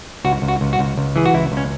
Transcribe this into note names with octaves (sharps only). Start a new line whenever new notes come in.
C#2 F#4
C#2
F#4
C#2
F#4
C#2
C#2
E3 G#4
F#4
C#2 E4
C#2
C#4